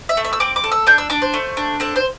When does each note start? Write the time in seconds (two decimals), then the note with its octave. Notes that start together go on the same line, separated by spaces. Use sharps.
0.09 E5
0.17 A3
0.25 E5
0.33 E6
0.40 C4 D6
0.56 D6
0.64 A4
0.72 E6
0.87 D4 G6
0.98 E6
1.10 D4 D6
1.22 C5
1.34 A3
1.57 D4
1.80 C4 A4
1.96 C5